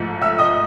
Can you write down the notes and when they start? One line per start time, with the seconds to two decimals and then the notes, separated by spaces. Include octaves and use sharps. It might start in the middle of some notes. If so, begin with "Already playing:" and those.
Already playing: G#2 F3 A3
0.22 E5 E6
0.38 D#5 D#6